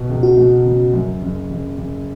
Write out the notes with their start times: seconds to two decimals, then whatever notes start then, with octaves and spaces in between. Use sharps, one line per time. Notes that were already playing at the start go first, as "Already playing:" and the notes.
Already playing: B2
0.09 C#2
0.23 F#4
0.37 B2
0.65 C#3
0.94 F#2
1.22 F#1
1.51 F#1
1.78 F#1